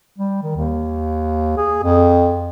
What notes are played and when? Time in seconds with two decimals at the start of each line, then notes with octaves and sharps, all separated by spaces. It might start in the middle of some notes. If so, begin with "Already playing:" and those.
0.18 G3
0.43 D#3
0.56 D#2
1.57 G#4
1.83 F2